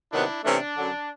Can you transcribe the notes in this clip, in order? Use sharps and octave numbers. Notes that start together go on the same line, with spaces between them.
C3 D#3 F#3 B3 D4 E4
C3 E3 A3 C#4 D4
F#2 D3 F#3